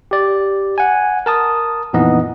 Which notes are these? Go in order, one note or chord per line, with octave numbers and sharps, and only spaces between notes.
G4 D5
F#5 G#5
A#4 A5 D#6
F2 A#2 E3 B3 D#4 D#5